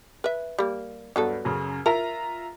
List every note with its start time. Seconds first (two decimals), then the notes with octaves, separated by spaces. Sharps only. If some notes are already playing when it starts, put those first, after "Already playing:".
0.24 B4 E5
0.58 G3 A#3
1.16 G2 F#3 B3 A4
1.45 F#2 C#3
1.86 F4 A#4 E5 A#5